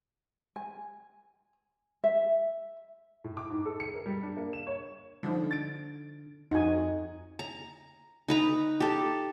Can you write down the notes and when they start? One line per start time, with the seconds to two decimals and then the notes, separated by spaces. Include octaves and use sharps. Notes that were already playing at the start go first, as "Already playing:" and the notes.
0.56 G#5
2.04 E5
3.24 A2
3.37 D6
3.50 G#2
3.65 A4
3.80 C#7
3.94 A#4
4.06 G3
4.23 D4
4.37 A#3
4.53 E7
4.67 C#5
5.23 D3 F3 D4 D#4
5.51 A6 D7
6.51 F2 D#4 F#4 G#5
7.39 A#5
8.28 D#4 B4 A#5
8.80 G4 A4